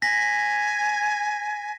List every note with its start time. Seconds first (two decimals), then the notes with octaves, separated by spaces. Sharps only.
0.02 G#5 A#6 B6